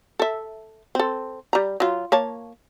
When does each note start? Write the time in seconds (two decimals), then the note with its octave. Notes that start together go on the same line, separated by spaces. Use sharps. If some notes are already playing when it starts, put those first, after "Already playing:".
0.19 A4 E5
0.95 C4 A4
1.53 G3 A#5
1.80 F#3 F4
2.12 A#3 C#5 A5